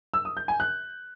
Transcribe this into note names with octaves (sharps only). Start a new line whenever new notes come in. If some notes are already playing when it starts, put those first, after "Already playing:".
E6
D#6
G6
G#5
F#6